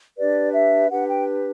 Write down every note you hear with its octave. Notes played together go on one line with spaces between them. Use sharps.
D4 G4 B4 D5
E5
D4 G4 B4 F#5
G5